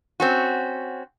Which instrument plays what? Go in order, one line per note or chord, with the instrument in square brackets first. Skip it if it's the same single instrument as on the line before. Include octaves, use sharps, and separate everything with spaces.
[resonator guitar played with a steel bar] C4 C#4 F#4